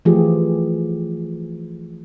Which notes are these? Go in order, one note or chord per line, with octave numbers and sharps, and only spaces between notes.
E3 F3 A3 F4 G4 G#4